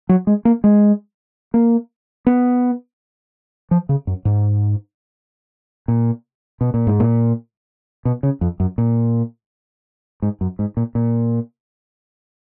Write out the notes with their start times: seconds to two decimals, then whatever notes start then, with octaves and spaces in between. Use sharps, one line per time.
0.09 F#3
0.27 G#3
0.45 A#3
0.64 G#3
1.54 A#3
2.27 B3
3.71 F3
3.89 C#3
4.07 F#2
4.25 G#2
5.88 A#2
6.61 B2
6.74 A#2
6.87 G#2
7.00 A#2
8.05 B2
8.23 C#3
8.41 F2
8.60 F#2
8.78 A#2
10.22 G#2
10.41 F#2
10.59 G#2
10.77 A#2
10.95 A#2